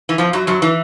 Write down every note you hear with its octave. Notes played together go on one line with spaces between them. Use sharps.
E3
F2 F3
F#2 F#3
F#2 F#3
E3